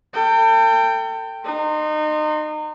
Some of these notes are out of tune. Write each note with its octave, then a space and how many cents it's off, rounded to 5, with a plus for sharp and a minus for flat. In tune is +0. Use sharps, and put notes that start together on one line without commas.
A4 +40 G5 +0
D#4 -30 C6 +5